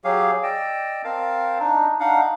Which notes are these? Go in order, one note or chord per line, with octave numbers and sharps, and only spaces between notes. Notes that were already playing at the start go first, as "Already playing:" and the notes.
F#3 G4 G#4 F5
D5 D#5 G5 E6
C4 A#4 F5 A5
D4 D#4
D4 D#4 F5 F#5